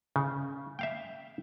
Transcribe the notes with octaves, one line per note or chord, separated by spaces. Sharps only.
C#3
E5 F5 G5